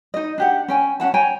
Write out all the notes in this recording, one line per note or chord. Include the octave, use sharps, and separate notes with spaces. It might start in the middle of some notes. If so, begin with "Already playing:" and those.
D#4 D#5
D4 G4 F#5
C#4 G5 G#5
C#4 D#4 F#5 A5
C#5 G5 G#5 A#5